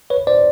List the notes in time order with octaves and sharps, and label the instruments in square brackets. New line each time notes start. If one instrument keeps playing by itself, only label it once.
[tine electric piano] B4 C#5
C5 D5